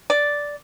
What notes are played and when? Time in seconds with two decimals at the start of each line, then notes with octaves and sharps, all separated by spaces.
0.10 D5